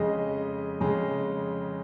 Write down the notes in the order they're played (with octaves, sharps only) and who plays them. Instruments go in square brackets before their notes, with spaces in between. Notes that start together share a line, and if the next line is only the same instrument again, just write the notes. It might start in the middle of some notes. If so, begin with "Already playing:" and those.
Already playing: [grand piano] F2 C#3 G#3 D#5
F2 C#3 G#3